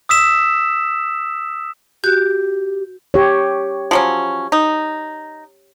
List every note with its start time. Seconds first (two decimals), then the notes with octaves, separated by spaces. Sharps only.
0.09 D#6 E6 B6 E7
2.04 F#4 G4 F#6 G6
3.14 G4 C#5
3.91 F3 F#3 C#4
4.52 D#4